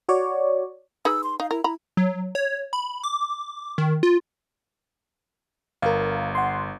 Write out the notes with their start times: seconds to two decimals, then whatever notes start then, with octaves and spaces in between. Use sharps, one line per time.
0.09 F#4 C#5 D5
1.05 D#4 G#4 B4 E6
1.23 C6
1.40 D#4 F5
1.51 E4 A#4
1.64 E4 A#5 B5
1.97 F#3
2.35 C#5
2.73 B5
3.03 D6
3.78 D#3
4.03 F4
5.82 G1 A#4 F5
6.35 F#5 C6